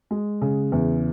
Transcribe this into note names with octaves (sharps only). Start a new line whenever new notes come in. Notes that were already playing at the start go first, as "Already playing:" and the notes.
G#3
C#3
E2